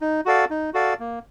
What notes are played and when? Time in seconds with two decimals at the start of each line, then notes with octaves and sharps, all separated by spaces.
0.01 D#4
0.25 F#4 A4 D5 F5
0.50 D#4
0.74 F#4 A4 D5 F5
1.00 A#3